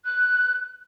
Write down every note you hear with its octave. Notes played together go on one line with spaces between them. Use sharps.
F#6